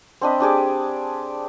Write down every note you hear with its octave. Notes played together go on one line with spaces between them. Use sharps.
C4 D4 D#5 B5
D4 G4 G#4 D5